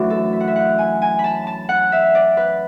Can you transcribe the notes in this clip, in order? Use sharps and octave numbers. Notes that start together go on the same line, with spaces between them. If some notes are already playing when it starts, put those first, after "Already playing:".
Already playing: F#2 E3 A3 D4 E4 F#4
A4
E5
F#5
E5
F#5
G#5
G#5
B5
A5
A5
F#5
E5
D5
B4